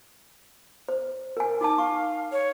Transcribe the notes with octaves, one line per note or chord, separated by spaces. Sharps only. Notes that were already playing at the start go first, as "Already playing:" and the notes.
C5
A#4 G#5
D#4 G#5 A5 D6
F5 C#6
C#5